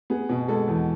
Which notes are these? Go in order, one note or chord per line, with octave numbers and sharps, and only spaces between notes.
B3 G#4
B2
G#3 A4
E2